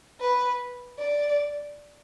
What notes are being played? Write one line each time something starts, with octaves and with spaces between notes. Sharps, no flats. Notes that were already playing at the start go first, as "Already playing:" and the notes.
B4
D5